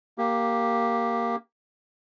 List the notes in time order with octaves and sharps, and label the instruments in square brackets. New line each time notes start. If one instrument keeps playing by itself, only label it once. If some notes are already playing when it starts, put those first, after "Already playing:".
[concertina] A#3 G4